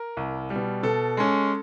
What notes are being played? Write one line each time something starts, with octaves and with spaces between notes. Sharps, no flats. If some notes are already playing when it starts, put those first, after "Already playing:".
Already playing: A#4
C2
G3
B2
B2 A4
G#3 C#4